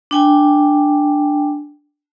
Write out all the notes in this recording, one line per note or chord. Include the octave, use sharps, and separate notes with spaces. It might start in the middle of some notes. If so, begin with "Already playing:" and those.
D4 G5 G#5